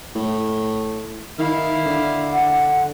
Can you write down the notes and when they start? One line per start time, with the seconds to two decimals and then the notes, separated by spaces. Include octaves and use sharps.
0.15 A2
1.39 D#3 E4 F5
1.86 D3
2.32 F#5